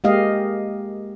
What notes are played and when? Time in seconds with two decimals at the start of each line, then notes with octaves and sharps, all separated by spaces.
0.04 G#3 A#3 G4 D#5 F5